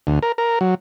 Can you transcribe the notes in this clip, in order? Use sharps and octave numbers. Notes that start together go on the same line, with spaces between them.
D2
A#4
A#4
F#3